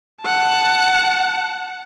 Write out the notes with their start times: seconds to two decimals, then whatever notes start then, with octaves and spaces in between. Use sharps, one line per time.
0.22 F#5 A5